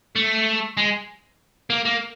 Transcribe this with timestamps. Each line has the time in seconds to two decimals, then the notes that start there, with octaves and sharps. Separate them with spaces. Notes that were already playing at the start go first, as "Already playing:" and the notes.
0.16 A3
0.77 G#3
1.70 A#3
1.85 A#3